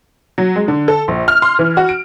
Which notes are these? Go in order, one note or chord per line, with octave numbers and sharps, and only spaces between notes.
F#3
G#3
D3
A4
A#1
F6
C6
E3
F#4
D7